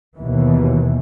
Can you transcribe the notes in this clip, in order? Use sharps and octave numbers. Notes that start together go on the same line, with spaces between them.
D#2 B2 E3